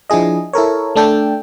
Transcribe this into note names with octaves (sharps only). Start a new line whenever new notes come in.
F3 D4 E4 G#4 D#5
E4 A4 A#4 C#5
A3 D4 A4 G5